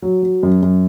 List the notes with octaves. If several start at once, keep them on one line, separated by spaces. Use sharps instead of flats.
F#3
F#3
F#2
F#2